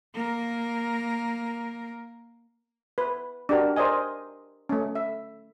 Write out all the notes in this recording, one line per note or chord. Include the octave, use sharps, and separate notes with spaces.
A#3 A#4
B4
D4 F#4 G4 A#4
A#4 C5 D5 D#5 G#5
A3 C#4
E5